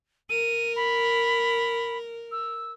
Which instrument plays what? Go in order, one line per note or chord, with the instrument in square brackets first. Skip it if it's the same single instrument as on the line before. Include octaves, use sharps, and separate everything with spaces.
[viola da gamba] A#4 [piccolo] D#7
[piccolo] B5
E6